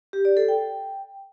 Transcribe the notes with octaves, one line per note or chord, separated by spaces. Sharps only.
G4
D5
A4
G5